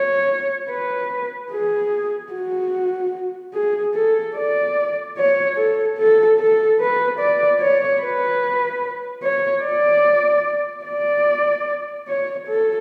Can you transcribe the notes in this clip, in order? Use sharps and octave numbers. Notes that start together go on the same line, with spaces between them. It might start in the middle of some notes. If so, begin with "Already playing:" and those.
Already playing: C#5
B4
G#4
F#4
G#4
A4
D5
C#5
A4
A4
A4
B4
D5
C#5
B4
C#5
D5
D5
C#5
A4